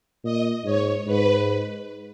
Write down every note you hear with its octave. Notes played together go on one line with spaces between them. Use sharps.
A#2 D#5
G#2 C#5
G#2 B4